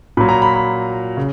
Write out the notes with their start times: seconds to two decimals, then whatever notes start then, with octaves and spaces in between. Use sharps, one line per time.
0.17 A#2 F#3 B5
0.29 A#5
0.42 B5
0.54 B5
1.17 C#3